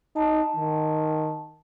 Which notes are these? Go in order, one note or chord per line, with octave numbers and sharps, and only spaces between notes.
D#4 A5
D#3